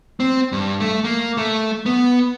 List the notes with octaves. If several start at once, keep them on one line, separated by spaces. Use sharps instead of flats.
C4
G2
A3
A#3
A3
B3